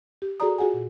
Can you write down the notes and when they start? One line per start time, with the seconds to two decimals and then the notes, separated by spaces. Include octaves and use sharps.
0.22 G4
0.40 F#4 G#4 A4 D5 A#5 D#6
0.58 F4 F#4 G#4 F#5 G#5
0.74 A#2